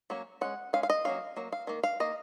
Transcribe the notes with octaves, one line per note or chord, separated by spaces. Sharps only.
F#3 A#3 C#4
G#3 C#4 F#5
G#3 C#4 F5
F5
D#5
F#3 A#3 C#4 F5
F#3 A#3
F5
D#3 A#3
F5
D#3 A#3 D#5